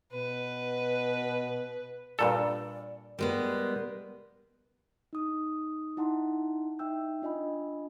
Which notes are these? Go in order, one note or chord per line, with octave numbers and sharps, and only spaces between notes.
B2 B4
G2 A#2 A4 D5
G3 G#3 B3 A#4
D#4 D#6
D#4 E4 F#5 A5 A#5 C6
D#4 E5 G5 E6 G6
D4 F4 D#5 G#5 B5